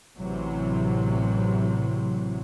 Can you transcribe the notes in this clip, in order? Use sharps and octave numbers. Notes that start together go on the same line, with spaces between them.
A1 C3 E3 F#3